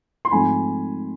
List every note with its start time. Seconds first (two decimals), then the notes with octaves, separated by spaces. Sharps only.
0.25 C6
0.31 G#2 F3 A3 C4 G#5 B5